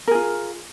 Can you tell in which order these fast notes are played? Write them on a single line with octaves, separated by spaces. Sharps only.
A#4 G#4 F4